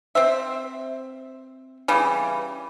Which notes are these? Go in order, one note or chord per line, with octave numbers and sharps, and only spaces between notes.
C4 C5 E5
C#3 E3 G3